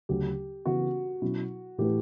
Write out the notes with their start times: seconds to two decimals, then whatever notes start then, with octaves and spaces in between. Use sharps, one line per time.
0.09 D2 C#3 F#3 G4
0.66 C#3 E3 B3 F#4
1.22 B2 F#3 C#4 E4
1.78 A2 E3 A3 E4 G4 B4